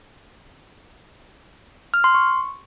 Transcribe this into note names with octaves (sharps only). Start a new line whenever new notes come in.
F6
C6
C#6